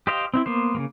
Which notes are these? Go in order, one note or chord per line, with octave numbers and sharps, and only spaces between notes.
G4 C5 D#5 F5 G5
C4 D#4 E4
A#3 B3 C5
C#3 G#3 A#3